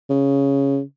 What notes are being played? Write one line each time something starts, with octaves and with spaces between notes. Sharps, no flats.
C#3